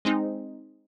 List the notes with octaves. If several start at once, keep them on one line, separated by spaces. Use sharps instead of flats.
G#3 C4 D#4